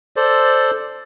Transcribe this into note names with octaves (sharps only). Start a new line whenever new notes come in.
A4 C5 D5